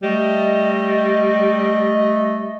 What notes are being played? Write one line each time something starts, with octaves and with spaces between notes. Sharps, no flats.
G3 A3 D#5